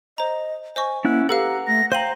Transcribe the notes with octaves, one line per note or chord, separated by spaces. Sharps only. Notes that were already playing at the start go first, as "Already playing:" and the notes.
C5 D#5 A#5
C5 D#5 G#5 C#6
A#3 C#4 E4 F#5
G4 A4 B4 F5 F#5 A#5 E6
A3 A#6
C5 F5 G5 A#5 C6 D#7 F#7